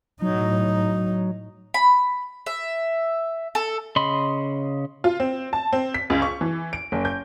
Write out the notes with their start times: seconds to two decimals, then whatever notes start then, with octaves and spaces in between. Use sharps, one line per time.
0.22 A2 F#3 D#4
1.74 B5
2.46 E5
3.55 A4
3.96 C#3 D#5 B5 C6
5.04 F4
5.20 C4
5.53 A5
5.73 C4
5.94 B6
6.10 C#2
6.22 C#6
6.41 E3
6.73 D7
6.92 F#1
7.05 G6